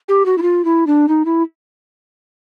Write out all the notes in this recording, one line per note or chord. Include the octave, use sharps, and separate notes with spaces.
G4
F#4
E4
F4
E4
D4
D#4
E4